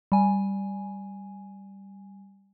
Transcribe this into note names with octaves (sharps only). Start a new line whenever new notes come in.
G3 G#5